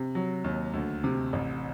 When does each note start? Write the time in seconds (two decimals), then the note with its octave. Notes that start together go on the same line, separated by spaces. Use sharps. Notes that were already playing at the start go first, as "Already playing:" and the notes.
Already playing: C3
0.15 F#3
0.44 D#2
0.74 D2
1.04 C3
1.33 A1